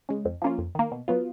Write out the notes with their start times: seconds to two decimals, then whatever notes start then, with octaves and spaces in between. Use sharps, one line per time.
0.09 C#3 G#3
0.25 F2
0.42 F3 A#3 C#4 F4
0.58 F2
0.75 D#3 A#3
0.92 B2
1.08 F#3 B3 F4